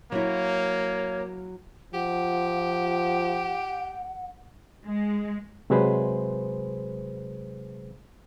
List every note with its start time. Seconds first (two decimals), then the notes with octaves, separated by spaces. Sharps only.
0.12 F#3 A#3 E4 C#5
1.94 F3 G4 F#5
4.86 G#3
5.70 C3 F#3 G#3 G#4 B4 C5